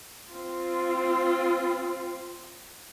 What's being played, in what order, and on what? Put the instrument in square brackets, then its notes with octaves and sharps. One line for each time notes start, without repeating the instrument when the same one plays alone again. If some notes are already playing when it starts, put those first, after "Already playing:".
[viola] C4 F4